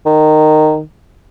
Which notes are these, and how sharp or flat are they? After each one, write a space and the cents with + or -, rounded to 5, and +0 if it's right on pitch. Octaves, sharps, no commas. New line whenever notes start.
D#3 -15